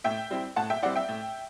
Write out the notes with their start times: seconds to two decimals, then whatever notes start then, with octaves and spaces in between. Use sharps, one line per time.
0.04 A2 E5 G5
0.30 G3 C4 E4
0.56 A2 F#5 A5
0.70 E5 G5
0.82 G3 C4 E4 D5 F#5
0.96 E5 G5
1.09 A2